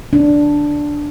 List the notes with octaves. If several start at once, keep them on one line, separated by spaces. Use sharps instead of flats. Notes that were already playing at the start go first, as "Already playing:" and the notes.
D4